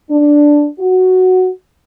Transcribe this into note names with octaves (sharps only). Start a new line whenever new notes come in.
D4
F#4